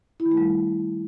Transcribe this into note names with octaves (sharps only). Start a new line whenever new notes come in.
E4
D#3
A3
G3